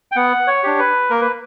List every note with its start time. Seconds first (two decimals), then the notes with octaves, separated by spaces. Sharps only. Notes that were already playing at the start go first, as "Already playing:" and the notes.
0.12 G5
0.16 B3 F#5
0.47 C#5
0.63 D4 G4
0.79 B4
1.10 A#3 A#4
1.21 B4